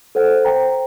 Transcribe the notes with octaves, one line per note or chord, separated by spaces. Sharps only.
A4 C5 F#5
C5 G5 A#5